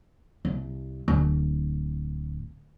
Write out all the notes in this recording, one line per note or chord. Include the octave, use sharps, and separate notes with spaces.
C2
D1